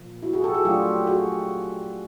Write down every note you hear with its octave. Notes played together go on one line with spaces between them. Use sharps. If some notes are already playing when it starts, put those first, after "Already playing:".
Already playing: A#2 F3 A#3
E4 F#4
F#4 G#4
G4 A4
F#4 G#4
F#3 A3 D4 F4 G4
F#4 G#4